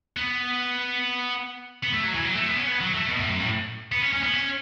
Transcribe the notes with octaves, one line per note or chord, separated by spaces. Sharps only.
B3
B3
A3
F#3
E3
F#3
A3
B3
C#4
B3
F#3
A3
B2
A2
F#2
A2
B3
C#4
C#4
B3
C#4